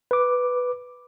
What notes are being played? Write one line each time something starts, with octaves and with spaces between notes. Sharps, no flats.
B4 D6